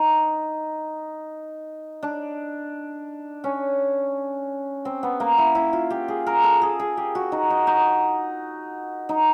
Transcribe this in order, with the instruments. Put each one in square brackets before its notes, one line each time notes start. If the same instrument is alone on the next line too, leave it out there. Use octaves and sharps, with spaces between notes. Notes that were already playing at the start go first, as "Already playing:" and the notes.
Already playing: [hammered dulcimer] D#4
D4
C#4
C4
B3
A#3
E4
E4
F4
G4
G#4
A#4
A4
G#4
G#4
G4
F#4
D#4
D#4
D#4
D#4